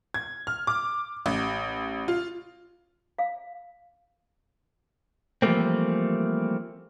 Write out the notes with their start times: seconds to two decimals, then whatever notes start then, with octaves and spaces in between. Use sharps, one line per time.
0.14 G#6
0.47 F6
0.67 D6
1.26 A1
2.08 F4
3.19 F5
5.42 E3 F3 G3 A3 A#3 C4